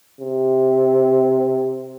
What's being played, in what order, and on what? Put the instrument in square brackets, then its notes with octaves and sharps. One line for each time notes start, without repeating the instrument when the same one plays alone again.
[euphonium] C3